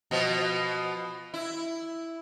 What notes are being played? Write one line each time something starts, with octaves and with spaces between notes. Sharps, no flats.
B2 F3
E4